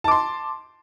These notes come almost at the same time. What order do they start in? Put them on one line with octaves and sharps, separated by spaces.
A5 D6 C6